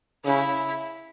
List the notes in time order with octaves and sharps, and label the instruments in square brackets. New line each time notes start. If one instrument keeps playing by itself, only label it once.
[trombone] C#3 [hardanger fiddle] E4